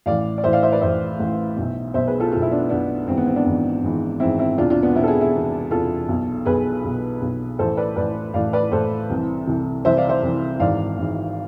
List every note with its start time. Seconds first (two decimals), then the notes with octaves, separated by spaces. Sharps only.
0.06 A1 A2 E3 D5 F5
0.38 D5
0.44 A1 A2 E3 C5 E5
0.53 D5 F5
0.63 C5 E5
0.72 B4 D5
0.81 A1 A2 E3 C5 E5
1.19 A1 A2 E3
1.56 B1 B2
1.94 B1 B2 C5 E5
2.07 G#4 B4
2.20 F4 A4
2.32 B1 B2 F4 A4
2.42 E4
2.51 B3 D4
2.69 B1 B2 B3 D4
3.07 G#1 G#2 E3 C4
3.17 B3
3.27 C4
3.36 B3 D4
3.46 G#1 G#2 E3
3.83 G#1 G#2 E3
4.20 G#1 G#2 E3 C4 E4
4.39 C4 E4
4.57 E1 E2 C3 D4 F4
4.70 D4 F4
4.83 B3 D4
4.96 E1 E2 C3 C4 E4
5.03 A4
5.08 E4 G#4
5.21 E4 G#4
5.33 E1 E2 C3
5.71 E1 E2 C3 F4 A4
6.09 B1 B2
6.46 B1 B2 G#4 B4
6.84 B1 B2
7.22 B1 B2
7.59 A1 A2 E3 A4 C5
7.77 B4 D5
7.96 A1 A2 E3 B4 D5
8.34 A1 A2 E3 D5 F5
8.53 B4 D5
8.72 A1 A2 E3 A4 C5
9.10 C2 C3 E3
9.47 C2 C3 E3
9.84 C2 C3 E3 C5 E5
9.97 D5 F5
10.09 C5 E5
10.22 C2 C3 E3
10.59 G#1 G#2 E3 D5 F5
10.98 G#1 G#2 E3